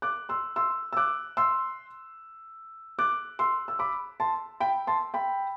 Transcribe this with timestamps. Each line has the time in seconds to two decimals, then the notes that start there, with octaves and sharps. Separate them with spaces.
0.02 D6 F#6
0.29 C6 E6
0.56 C6 E6
0.93 E6
0.97 D6 F#6
1.37 C6 E6
2.99 D6 F#6
3.39 C6 E6
3.68 E6
3.79 B5 D6
4.20 A5 C6
4.60 G5 B5
4.87 A5 C6
5.14 G5 B5